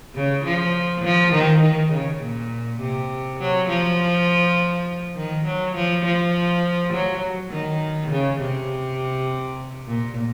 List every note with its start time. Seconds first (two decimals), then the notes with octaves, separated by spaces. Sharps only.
0.15 C#3
0.45 F3
1.04 F3
1.33 D#3
1.62 D#3
1.92 C#3
2.21 A#2
2.80 C3
3.40 F#3
3.69 F3
5.16 D#3
5.46 F#3
5.75 F3
6.05 F3
6.93 F#3
7.51 D#3
8.11 C#3
8.40 C3
9.88 A#2